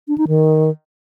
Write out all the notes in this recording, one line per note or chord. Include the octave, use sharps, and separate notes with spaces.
D4
D#4
D#3